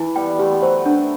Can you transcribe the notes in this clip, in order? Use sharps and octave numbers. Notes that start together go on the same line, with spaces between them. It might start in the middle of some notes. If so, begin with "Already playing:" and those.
Already playing: E3 E4
G3 B3 G5
A3 G4
B3
F#3 A3 C5
F#3 A3 D4